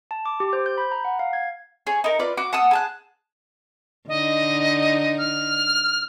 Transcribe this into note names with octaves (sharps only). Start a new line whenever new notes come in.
A5
D6
G4
C5
G6
B5
A#5
F#5
F5
G#6
G#4 C#5
D#4 A#4
F4 B4 D5
F#4 D6
F#5 A5 D#6 E6
G#4 A5 F#6
D3 D#4 D#5
F6